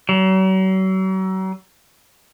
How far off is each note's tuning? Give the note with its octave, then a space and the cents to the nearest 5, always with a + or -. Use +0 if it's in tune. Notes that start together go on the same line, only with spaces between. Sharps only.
F#3 +40